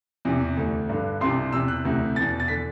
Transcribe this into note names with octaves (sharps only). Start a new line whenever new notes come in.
E2 C3 E3
D2 D3
G2 D3
C2 C3 E3 C6
E2 C3 E3 E6
F#6
D2 C3 E3
E2 B2 A6
A6
D3 B6